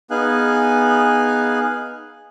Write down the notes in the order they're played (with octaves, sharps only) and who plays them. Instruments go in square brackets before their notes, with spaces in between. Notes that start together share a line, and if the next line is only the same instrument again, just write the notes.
[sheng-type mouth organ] B3 D#4 G#4 F5 G#5 F#6